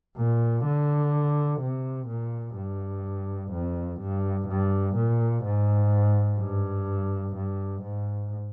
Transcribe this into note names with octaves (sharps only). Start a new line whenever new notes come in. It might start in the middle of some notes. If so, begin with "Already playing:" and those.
A#2
D3
C3
A#2
G2
F2
G2
G2
A#2
G#2
G2
G2
G#2